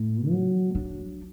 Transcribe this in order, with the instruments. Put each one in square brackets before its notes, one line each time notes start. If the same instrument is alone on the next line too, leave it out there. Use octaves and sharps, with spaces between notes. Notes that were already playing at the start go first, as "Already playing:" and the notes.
Already playing: [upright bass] A2
F#3
D4